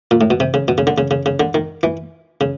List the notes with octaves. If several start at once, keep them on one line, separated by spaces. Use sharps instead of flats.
A#2
A2
B2
C3
C#3
B2
C#3
D3
C#3
C#3
C#3
D3
D#3
E3
C#3